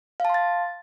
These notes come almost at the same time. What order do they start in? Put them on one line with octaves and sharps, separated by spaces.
F5 A5 C6 A6